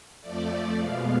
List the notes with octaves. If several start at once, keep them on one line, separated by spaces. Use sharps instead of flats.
F2 F3 A3 D5
B2 G#3 B3 F5